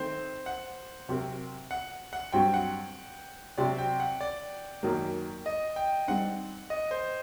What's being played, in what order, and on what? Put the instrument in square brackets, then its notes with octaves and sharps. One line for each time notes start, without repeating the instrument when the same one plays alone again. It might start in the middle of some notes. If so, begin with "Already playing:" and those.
Already playing: [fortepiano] D#3 A3 C4 [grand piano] C5
[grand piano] F#5
[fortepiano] C3 F#3 C4 G4 A#4
[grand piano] F#5
F#5
[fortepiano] G2 F#3 C4 F#4 [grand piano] G5
[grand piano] F#5
[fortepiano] C3 F#3 C4 [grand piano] D5
[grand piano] G5
F#5
D5
[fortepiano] F#2 D#3 F#3 A#3
[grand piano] D#5
G5
[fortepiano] G3 C4 D#4 [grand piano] F#5
[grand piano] D#5
C5